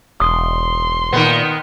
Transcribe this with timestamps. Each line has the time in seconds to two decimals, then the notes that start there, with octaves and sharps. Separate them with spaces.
0.20 E1 C6 D#6
1.13 A#2 D#3 B3